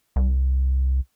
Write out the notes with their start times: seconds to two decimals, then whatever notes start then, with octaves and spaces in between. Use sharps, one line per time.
0.16 C2